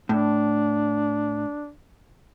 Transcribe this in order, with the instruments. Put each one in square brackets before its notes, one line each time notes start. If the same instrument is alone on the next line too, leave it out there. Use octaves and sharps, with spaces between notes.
[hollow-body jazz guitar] A2 [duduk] D4